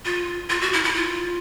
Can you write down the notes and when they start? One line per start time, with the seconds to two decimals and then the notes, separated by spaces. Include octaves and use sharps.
0.05 F4
0.50 F4
0.61 F#4
0.73 E4
0.84 E4
0.95 F4